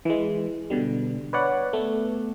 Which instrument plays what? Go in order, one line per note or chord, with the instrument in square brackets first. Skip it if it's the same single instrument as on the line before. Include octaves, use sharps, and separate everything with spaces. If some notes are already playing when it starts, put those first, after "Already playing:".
[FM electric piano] E3 G#3
B2 D3 G3
B4 C#5 D5 F#5
A3 B3